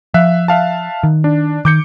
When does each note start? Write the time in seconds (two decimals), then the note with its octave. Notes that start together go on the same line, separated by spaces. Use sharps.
0.14 F3 E5 F5 F#6
0.48 E5 F5 A5
1.03 D#3
1.24 D4
1.65 D#3 D6 G6 C#7